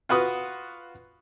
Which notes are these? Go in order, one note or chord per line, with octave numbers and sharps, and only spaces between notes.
F4 F#4 B4 D#6